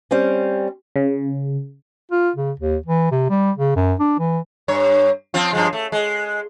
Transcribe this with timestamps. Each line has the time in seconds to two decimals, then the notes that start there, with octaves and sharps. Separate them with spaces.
0.11 G3 C4 C#4
0.96 C#3
2.11 F4
2.36 C#3
2.59 D#2
2.86 E3
3.11 C3
3.30 G3
3.58 C#3
3.76 F#2
3.99 D4
4.19 E3
4.68 G2 C#5
5.34 F3 C4 F4
5.53 G2 F3 G#3
5.73 A3
5.92 G#3